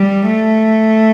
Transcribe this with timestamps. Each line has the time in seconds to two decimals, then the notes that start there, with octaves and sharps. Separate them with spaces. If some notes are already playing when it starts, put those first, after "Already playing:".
Already playing: G3
0.28 A3